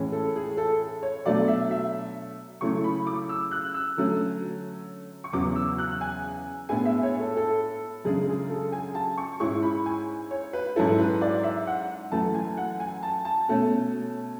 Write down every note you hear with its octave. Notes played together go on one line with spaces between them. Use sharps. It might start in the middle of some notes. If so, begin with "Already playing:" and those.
Already playing: A2 E3 G#3 C#4
A4
G#4
A4
C#5
B2 F#3 A3 D4 D5
E5
E5
C#3 F#3 A3 E4 C#6
B5
D6
E6
F#6
E6
D3 F#3 A3 C#4
C#6
E2 C#3 F#3 B3 D6
E6
F#6
G#5
A2 G#3 B3 D4 G#5
E5
C#5
A4
A4
F#2 C#3 G#3 D4 G#4
G#4
A4
G#5
A5
C#6
G#2 G#3 C#4 E4 C#6
B5
G#5
C#5
B4
G#2 F#3 C#4 E4 A4
B4
D5
E5
F#5
F#2 E3 A3 A5
G#5
F#5
G#5
A5
A5
B2 A3 C#4